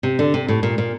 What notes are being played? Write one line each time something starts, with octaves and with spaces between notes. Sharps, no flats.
C3
D3
C3
A2
A#2
A#2